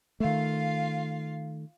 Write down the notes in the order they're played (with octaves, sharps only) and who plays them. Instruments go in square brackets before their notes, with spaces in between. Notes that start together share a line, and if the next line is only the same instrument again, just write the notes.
[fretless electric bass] D#3 A3 [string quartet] F4 F5